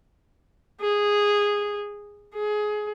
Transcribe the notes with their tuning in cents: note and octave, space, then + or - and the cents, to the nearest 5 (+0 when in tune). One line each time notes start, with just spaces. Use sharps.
G#4 -10
G#4 +20